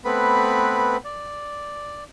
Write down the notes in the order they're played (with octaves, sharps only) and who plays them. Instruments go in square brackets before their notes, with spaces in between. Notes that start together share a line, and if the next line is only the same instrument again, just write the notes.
[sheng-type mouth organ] A3 B3 C4 B4 B5
D5